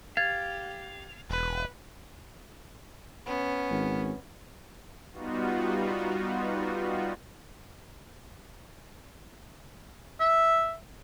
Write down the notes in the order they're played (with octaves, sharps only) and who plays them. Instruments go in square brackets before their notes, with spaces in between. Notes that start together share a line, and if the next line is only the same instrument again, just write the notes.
[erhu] G4 [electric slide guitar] F5 [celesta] G#6 A6
[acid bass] E1 [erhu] B4
[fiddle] B3 [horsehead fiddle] C#4
[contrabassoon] G#1
[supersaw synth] G3 B3 D#4 F4 F#4
[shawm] E5